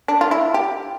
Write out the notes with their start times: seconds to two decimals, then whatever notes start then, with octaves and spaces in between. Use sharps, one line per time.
0.08 D4
0.21 F4
0.31 E4
0.54 G4